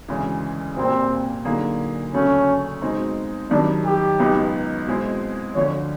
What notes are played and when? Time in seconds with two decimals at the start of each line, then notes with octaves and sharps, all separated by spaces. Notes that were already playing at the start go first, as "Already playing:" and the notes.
0.08 D2 C#3 E3 G#3
0.77 A#2 G3 A#3 C4
1.45 D3 F#3 A#3 D#4 G#4
2.14 D2 C#3 F#3 A3 C#4
2.82 B2 G#3 C4 D#4
3.50 F#2 D#3 G3 D4
3.85 G4
4.19 C#2 B2 F#3 B3 D#4
4.87 B2 G#3 C4 E4
5.55 D2 D3 F3 C#5